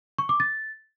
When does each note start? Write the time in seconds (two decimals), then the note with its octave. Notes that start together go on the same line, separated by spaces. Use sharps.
0.18 C#6
0.29 D6
0.40 A6